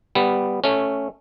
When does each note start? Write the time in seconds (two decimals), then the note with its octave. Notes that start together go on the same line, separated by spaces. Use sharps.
0.15 G3 B3
0.64 A3 C#4